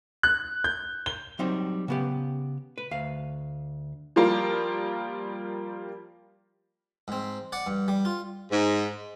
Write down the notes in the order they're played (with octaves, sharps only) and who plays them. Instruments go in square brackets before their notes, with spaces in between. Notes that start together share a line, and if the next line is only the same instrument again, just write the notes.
[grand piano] F#6
G6
G7
[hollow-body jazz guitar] F#3 G3 C4 D#4
C#3 B3 G4
B4
D2 F5
[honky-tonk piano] F3 G3 A#3 F4 A#4
[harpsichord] G#2 C4
D5 F#5
G2
G3
F4
[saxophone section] G#2